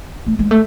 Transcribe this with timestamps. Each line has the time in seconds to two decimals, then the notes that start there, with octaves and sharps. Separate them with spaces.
0.27 A3
0.39 G#3
0.51 A3